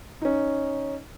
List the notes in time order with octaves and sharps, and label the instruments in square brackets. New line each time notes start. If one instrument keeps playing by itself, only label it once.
[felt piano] C#4 D#4